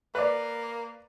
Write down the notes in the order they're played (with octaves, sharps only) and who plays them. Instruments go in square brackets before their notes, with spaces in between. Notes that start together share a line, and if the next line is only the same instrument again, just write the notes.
[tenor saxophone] A#3 [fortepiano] B4 D5